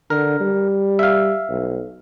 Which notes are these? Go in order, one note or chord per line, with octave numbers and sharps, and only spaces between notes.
D3 A#4
G3
E5 F5
B1